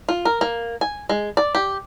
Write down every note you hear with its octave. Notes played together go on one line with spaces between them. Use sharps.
F4
A#4
A#3
G#5
G#3
D5
G4